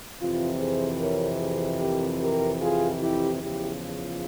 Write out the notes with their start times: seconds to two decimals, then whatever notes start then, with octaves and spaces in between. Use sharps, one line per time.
0.20 F2 C3 E3 F4
0.60 G#4 C5
1.00 A#4 C#5
1.40 G#4 C5
1.80 G4 A#4
2.21 G4 A#4
2.61 F4 G#4
3.01 E4 G4
3.41 E2 C#3 F3 E4 G4
3.82 F4